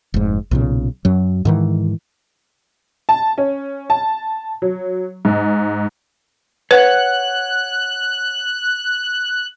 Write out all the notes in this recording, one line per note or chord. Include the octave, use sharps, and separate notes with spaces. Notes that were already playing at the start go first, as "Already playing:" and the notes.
F1 G#2
B1 A#2 C#3
F#2 F#3
G#2 D#3 E3
A5
C#4
A5
F#3
G#2
B4 C#5 F#5 F#6